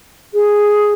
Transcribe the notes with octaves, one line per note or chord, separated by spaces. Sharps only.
G#4